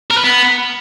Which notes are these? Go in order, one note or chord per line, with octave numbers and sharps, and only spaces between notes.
A#4
B4
B3